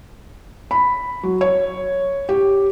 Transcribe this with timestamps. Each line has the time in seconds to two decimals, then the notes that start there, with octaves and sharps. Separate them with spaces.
0.71 B5
1.23 F#3
1.41 C#5
2.29 G4